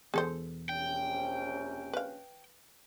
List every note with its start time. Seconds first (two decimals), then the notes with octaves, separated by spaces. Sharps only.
0.14 E1 E3 B3 G#4 A4 C5
0.69 A#1 C3 C#4 G5
1.93 B4 F5